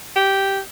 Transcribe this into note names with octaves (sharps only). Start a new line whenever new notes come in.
G4